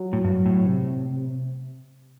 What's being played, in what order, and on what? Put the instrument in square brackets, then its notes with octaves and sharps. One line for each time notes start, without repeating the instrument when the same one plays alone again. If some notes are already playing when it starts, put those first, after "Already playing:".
Already playing: [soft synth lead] F#3
[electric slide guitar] A2
G2
A2
[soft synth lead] C3
C3